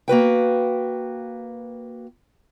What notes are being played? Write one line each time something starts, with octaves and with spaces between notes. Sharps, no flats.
A#3 F#4 B4 G5